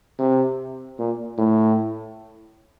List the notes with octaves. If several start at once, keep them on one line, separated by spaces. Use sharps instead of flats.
C3
A#2
A2